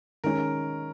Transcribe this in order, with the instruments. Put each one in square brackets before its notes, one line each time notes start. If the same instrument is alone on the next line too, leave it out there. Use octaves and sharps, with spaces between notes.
[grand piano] D#3 G#3 C#4 [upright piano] A#4